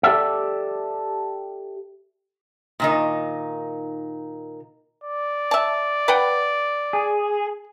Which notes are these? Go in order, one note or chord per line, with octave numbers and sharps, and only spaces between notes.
G4 A4 D5 E5
A#2 D#3 D#4
D5
E5 A5
B4 F#5 G5
G#4